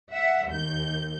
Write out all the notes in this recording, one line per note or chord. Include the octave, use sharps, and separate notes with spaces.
E5 F#5
D#2 G6